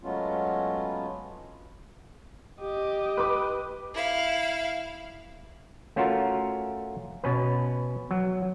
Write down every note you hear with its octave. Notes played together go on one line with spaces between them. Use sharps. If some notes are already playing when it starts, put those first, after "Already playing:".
F#3 G#3 A3 B3 C#4 F4
G4 D#5
B4 D6
E4 F5
A3 C#4 F4 F#4 A#4
B2 C#4 B4
F#3